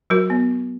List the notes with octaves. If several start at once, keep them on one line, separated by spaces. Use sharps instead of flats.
F#3 F#4 A#4
B3